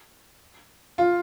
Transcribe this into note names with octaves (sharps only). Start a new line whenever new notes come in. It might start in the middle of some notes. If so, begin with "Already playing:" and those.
F4